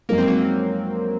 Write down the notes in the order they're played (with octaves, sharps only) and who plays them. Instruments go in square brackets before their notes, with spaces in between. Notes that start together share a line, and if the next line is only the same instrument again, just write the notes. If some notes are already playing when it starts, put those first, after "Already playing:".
[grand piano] F#2 F3 G#3 D#4 A#4 [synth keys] A#3
[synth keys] C4
F#3 A#3